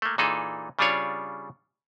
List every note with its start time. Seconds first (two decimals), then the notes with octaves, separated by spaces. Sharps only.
0.02 A3 A#3
0.18 A#2 E3 D#4 G#4 A4
0.79 C#3 G3 D4 F4 C#5 D5